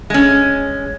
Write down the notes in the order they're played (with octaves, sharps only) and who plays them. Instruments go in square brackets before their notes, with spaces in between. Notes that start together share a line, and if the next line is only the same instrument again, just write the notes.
[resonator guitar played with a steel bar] G#3 C#4